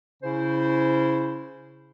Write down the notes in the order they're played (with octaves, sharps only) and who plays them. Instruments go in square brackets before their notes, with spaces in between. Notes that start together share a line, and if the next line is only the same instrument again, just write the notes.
[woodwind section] C#3 C#4 E4 C5